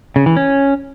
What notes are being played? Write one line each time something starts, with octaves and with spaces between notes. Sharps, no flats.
C#3
E3
C#4